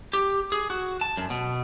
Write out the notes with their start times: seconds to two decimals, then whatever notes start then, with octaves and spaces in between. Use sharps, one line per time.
0.13 G4
0.52 G#4
0.70 F#4
1.01 A5
1.17 F#2
1.30 B2